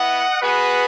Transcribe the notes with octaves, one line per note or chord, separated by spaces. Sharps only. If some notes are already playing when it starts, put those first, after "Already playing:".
Already playing: B3 E4 D#5 F#5
B3 F#4 G#4 B4